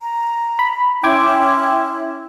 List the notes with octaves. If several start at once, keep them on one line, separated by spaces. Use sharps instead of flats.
A#5
B5
C#4 E4 G5 C6 D6 G#6